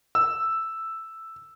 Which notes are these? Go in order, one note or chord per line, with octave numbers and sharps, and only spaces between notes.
E6